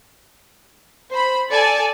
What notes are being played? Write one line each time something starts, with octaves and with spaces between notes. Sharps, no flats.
C5 B5
A4 D5 G#5 A5